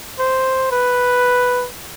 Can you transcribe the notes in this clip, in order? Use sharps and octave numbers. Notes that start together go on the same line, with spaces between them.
C5
B4